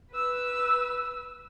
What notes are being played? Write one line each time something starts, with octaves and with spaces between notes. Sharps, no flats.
B4 E6